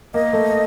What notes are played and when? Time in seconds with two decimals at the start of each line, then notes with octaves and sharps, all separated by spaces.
0.14 A#3 D#5
0.33 A3